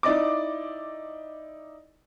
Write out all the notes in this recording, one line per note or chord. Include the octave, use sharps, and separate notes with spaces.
D#4 E4 D5 D#5 D6